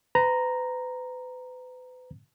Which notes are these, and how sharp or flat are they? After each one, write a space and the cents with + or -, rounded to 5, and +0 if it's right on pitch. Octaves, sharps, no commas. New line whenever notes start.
B4 +40 A#5 +0